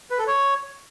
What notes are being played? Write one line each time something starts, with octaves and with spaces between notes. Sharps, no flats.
B4
A4
C#5